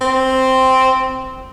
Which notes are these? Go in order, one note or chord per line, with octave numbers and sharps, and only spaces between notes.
C4